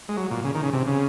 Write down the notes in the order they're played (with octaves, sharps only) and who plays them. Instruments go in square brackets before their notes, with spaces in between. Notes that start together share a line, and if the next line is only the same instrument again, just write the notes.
[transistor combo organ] G#3
F#3
A#2
C#3
D#3
C#3
C3
C#3